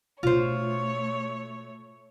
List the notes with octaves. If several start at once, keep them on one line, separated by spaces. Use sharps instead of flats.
B2 A3 D4 F4 C5 C#5